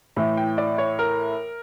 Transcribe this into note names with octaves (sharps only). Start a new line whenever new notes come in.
A2 E3 A3
G5
D5
C#5
A#4